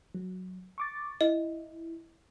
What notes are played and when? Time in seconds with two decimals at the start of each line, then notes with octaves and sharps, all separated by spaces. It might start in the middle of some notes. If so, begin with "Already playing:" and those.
0.15 F#3
0.78 C#6 D6 A6
1.21 E4 D#5